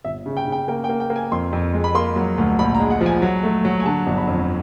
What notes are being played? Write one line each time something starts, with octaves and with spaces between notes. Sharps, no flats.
G1 E5
C#3
G5
C#3
G5
A#3 G5
G5
A#3
G5
A#3
G#5
F2 C6
F2
G#3
B5
A#3 C6
F#3
D2
A#1 B5
A#5
G#3
F#5
F3
G#5
F#3
A3
F#3
G#5
D3 A5
G1
B5
F2